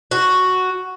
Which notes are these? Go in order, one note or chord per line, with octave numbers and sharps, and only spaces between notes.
F#4